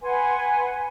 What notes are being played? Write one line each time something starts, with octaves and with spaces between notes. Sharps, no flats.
B4 F#5 G#5 C6